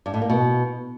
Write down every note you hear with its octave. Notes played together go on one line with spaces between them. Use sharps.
G2
A2
A#3
B2